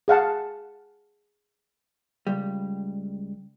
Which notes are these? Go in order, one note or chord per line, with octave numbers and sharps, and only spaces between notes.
G#4 F5 F#5 A5
C#2 G3